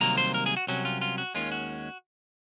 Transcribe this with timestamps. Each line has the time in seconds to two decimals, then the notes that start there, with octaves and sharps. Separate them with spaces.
0.01 C2 C3 D#3 F#3 A#3 A#5
0.18 C5
0.34 A#4
0.46 G#4
0.57 F#4
0.67 C2 C3 F#3 C#4 F#4
0.85 F4
1.01 F4
1.18 F#4
1.35 D#2 D#3 G#3 C#4 F4
1.52 F#4